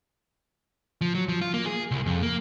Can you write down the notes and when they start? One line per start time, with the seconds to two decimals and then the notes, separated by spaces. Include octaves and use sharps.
1.01 F3
1.15 F#3
1.29 F3
1.41 F4
1.54 A#3
1.66 G#4
1.91 C2
2.06 F2
2.22 A#3